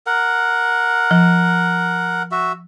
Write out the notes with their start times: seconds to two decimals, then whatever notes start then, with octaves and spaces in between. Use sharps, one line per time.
0.07 A#4 F#5
1.11 F3
2.32 F#4 E5